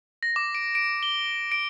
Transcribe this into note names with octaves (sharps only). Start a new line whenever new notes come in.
A#6
D6
D7
D7
G7
D7